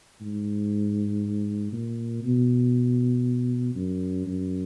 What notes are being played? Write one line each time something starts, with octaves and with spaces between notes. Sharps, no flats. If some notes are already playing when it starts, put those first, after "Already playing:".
G#2
A#2
B2
F#2
F#2